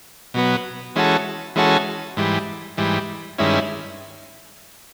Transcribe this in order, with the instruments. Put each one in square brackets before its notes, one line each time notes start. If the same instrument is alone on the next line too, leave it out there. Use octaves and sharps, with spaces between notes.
[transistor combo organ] B2 F#3 B3
E3 G#3 C#4 F#4 A4
E3 G#3 C#4 F#4 A4
G#2 E3 G3
G#2 E3 G3
G2 D#3 G#3 C#4 E4